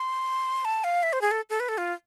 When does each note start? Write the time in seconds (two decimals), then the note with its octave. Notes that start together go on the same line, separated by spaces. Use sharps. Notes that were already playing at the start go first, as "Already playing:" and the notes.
Already playing: C6
0.65 A5
0.84 F5
1.03 E5
1.13 C5
1.21 G#4
1.31 A4
1.50 A4
1.60 B4
1.69 A4
1.78 F4